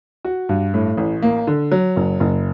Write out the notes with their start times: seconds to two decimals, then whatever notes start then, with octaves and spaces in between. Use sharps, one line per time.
0.25 F#4
0.49 G2
0.74 A2
0.97 A1
1.22 A#3
1.47 D3
1.72 F#3
1.96 F#1
2.20 F#1